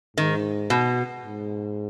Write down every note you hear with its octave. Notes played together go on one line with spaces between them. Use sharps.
G#2 D#3
B2
G#2